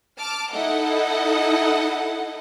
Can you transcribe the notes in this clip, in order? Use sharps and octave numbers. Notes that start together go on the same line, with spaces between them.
A5 D6 F6
D#4 E4 A4 D#5 F#5